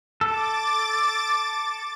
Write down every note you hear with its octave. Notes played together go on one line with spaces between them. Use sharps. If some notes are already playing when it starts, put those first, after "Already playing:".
A4 D6 A6